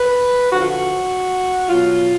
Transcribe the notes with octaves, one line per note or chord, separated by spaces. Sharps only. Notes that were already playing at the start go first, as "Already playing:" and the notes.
Already playing: B4
D3 F3 F#4
F4
F#4
B2 F#3 F4